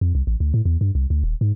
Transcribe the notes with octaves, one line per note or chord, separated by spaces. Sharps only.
F2
C2
A1
D2
A2
E2
G2
C2
D2
D#1
G#2